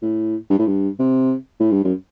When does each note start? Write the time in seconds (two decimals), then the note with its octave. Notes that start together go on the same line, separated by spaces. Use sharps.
0.02 A2
0.50 G2
0.59 A2
0.67 G2
0.99 C3
1.60 A2
1.71 G2
1.84 F#2